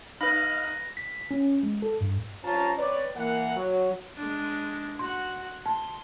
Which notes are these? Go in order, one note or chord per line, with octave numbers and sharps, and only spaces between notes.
D#4 B4 F5 B5 A#6
B6
C#4
G#3
A4
G2
G2 C#4 F4 C5 A5 A#5
C4 B4 C#5 D5
E3 A#3 F#5
F#3
G#3 D4
F#4 F#5 C6
A5 C6